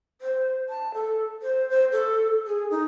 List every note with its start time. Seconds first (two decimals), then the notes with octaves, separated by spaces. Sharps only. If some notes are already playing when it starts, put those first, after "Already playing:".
0.21 C5
0.69 A5
0.94 A4
1.42 C5
1.70 C5
1.92 A4
2.47 G#4
2.71 D#4